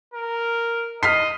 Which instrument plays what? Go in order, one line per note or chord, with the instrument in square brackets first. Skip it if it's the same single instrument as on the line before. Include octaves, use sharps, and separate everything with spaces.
[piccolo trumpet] A#4
[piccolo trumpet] D#5 [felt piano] F6 B6 C7